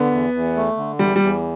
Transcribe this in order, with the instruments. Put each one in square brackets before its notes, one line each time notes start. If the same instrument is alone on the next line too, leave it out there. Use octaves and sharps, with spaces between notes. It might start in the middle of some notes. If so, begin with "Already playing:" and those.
Already playing: [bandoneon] D3 [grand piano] B3
[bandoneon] E2
E2
A3
D3
[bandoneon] E2 [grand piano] G3
[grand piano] G3
[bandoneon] E2